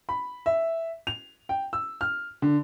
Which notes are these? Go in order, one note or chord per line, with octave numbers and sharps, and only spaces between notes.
B5
E5
F7
G5
E6
F6
D3